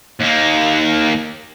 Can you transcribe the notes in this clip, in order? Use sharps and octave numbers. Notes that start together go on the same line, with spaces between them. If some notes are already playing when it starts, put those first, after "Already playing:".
D#2 A#3